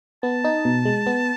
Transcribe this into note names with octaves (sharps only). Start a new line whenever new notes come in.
B3 A5
D#4
B2
G#3
B3